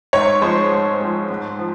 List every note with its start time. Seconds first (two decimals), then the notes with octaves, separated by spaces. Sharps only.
0.13 G#2 C#5
0.41 F3 G#3 C5
0.72 G#2
1.00 F3 G#3
1.30 G#2
1.59 F3